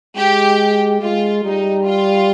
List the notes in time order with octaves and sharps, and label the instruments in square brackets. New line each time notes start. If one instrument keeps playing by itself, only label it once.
[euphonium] G#3 [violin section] G4
[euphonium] G#3 [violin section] F4
[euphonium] G3 [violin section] D#4
[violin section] F4